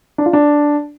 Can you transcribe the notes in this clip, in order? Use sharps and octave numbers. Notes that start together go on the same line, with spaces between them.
D4
F4
D4